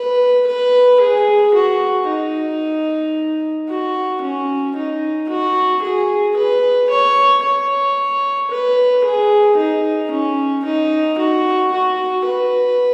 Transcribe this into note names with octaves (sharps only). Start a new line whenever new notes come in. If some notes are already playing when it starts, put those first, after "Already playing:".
Already playing: B4
B4
G#4
F#4
D#4
F#4
C#4
D#4
F#4
G#4
B4
C#5
C#5
B4
G#4
D#4
C#4
D#4
F#4
F#4
B4